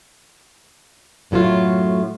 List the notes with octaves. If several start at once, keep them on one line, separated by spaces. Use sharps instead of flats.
F#2 A2 F#3 A3 F4